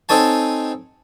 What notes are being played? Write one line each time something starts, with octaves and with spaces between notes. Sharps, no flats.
C4 D#4 A4 C#5 G#5 A5